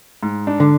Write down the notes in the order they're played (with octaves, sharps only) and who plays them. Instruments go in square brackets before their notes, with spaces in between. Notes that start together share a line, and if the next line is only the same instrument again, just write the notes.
[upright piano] G#2
D4
[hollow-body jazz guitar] D3